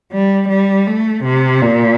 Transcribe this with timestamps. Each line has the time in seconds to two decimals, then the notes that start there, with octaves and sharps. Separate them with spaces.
0.12 G3
0.49 G3
0.87 A3
1.24 C3
1.62 A#2